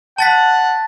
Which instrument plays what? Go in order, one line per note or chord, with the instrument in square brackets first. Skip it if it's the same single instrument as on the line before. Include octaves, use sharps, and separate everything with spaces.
[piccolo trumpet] F#5 [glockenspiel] A5 A6 B6